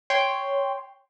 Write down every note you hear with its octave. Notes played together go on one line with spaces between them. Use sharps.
C#5 G5 C6